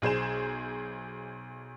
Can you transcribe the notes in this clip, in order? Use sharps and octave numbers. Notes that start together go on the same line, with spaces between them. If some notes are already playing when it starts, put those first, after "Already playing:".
B1 G#4 C5 E7